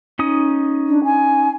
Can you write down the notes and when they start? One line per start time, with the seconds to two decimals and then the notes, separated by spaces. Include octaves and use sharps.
0.19 C#4 D#4 D#6
0.88 D4
1.04 G#5